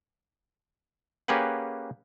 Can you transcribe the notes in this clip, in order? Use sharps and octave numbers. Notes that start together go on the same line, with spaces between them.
A#3 C#4 G4 G#4 B4 F#5